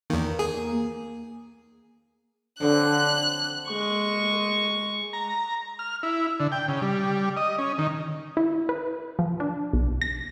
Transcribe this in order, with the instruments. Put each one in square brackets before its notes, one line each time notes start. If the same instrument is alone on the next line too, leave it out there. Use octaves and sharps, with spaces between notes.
[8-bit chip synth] E2 D#3 [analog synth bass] A#3
[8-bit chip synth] G#4
[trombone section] D3 [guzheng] F3 F#3 C4 [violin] F#6
[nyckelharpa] G#3 C#6
[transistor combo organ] A#5
F6
E4
D3
G5
C#3
G3
D#5
C#4
D#3
[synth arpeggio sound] E4
B4
F3
D4
B1
A#6